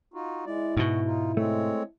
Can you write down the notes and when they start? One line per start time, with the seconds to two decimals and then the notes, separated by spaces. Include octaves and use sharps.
0.14 D#4 F4 F#4
0.46 G#3 E4 D5
0.77 G#2 B2 F#4
1.07 D#4 F4
1.37 G#3 A3 C4 C#5